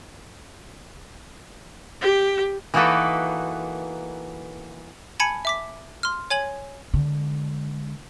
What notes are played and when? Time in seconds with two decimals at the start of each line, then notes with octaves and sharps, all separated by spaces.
2.01 G4
2.74 E3 A#3 D#4 F#4 A4 B4
5.20 G#5 A5 B5 G#6 C#7
5.45 E5 D6 B6
6.03 C6 F6
6.30 C#5 G#5 G#6 F#7
6.94 D3 G#3